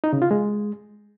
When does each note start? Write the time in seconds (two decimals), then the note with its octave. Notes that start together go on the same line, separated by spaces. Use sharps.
0.04 D#4
0.13 C#3
0.22 F4
0.31 G#3